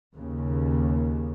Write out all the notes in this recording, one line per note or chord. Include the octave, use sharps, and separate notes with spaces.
D#2 C#3